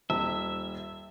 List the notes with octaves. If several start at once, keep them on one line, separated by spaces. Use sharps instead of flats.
D#1 E5